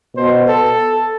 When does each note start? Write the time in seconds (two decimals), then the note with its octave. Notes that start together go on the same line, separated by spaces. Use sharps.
0.17 B2 C5
0.48 A4